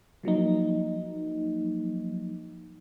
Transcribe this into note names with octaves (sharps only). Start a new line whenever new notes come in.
F3 F#3 A#3 D#4